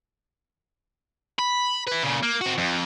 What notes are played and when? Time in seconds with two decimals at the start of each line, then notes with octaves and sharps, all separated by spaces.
1.39 B5
1.87 E4 B4
2.02 A#2 C#3
2.23 A#3
2.41 C4 F#4
2.58 F2